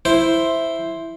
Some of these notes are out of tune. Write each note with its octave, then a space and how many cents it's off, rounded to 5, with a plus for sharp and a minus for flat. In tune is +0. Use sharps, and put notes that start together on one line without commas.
E4 +0 C5 +0